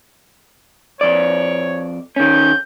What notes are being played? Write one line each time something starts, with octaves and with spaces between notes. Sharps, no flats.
F2 C#5 D5
D#3 C#4 G6